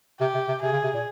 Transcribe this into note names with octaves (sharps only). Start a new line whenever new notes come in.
C3 G4
C3
C3
C3 G#4
C#3
C3
A#2